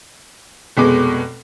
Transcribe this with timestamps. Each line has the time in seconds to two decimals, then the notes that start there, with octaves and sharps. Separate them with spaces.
0.77 F1 B2 G#3 D6